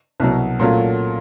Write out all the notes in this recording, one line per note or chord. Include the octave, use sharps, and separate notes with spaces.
C2 B2 F#3
A#2 F#3 A3 C#4 F4